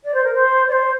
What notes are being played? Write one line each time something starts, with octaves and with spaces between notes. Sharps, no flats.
D5
C5
A#4
C5
D5
C5